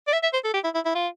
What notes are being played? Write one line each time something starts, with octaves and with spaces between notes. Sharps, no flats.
D5
E5
E5
C5
A4
G4
E4
E4
E4
F4